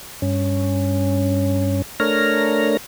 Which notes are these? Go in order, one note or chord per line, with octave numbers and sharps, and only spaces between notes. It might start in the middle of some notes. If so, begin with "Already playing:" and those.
G2 C#4
A3 D4 A#4 C#5 F6 A#6